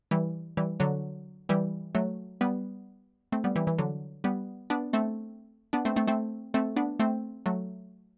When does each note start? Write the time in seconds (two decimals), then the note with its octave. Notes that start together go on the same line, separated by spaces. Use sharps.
0.11 E3 G3
0.57 E3 G3
0.80 D3 F#3
1.49 E3 G3
1.95 F#3 A3
2.41 G3 B3
3.32 A3 C4
3.44 G3 B3
3.56 E3 G3
3.67 E3
3.78 D3 F#3
4.24 G3 B3
4.70 B3 D4
4.93 A3 C4
5.73 B3 D4
5.85 A3 C4
5.96 A3 C4
6.07 A3 C4
6.54 A3 C4
6.76 B3 D4
6.99 A3 C4
7.46 F#3 A3